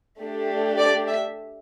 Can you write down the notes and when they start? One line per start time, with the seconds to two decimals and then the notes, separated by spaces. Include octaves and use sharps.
0.21 A3 D4 G4
0.79 D5
1.08 E5